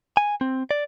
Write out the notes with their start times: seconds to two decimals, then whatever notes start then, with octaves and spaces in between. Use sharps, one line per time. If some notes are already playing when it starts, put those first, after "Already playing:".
0.17 G#5
0.41 C4
0.71 D5